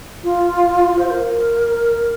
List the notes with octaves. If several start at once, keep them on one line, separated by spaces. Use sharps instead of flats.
F4
C5
A#4